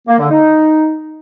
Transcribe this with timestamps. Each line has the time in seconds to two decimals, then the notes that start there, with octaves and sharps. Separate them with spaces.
0.08 A#3
0.19 D3
0.30 D#4